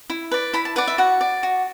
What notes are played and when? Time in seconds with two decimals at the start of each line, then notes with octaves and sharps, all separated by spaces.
0.10 E4
0.31 B4 D5
0.54 E4 B5
0.65 A5
0.76 B4 D5 F#5
0.87 E5
0.98 F#4 F#5
1.21 D5
1.43 F#4